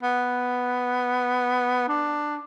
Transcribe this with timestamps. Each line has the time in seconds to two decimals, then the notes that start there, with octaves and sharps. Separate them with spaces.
0.03 B3
1.88 D4